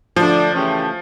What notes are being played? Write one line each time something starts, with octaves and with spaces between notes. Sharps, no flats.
D3 F3 A3 D4
C#3 E3 A3 C#4 G4